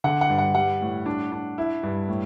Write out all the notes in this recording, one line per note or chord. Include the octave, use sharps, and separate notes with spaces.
D3 F#5
F#5
G2
F#5
G3 F#5
A2
D4
D4
E4
G2
A2